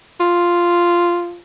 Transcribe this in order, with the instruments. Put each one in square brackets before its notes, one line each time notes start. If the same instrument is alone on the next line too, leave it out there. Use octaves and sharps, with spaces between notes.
[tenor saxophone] F4